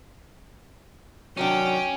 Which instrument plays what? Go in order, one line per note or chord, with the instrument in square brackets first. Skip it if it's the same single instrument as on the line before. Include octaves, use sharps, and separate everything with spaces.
[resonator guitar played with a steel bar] C3 D#3 D4 [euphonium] F#3 [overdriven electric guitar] C#4 [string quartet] G5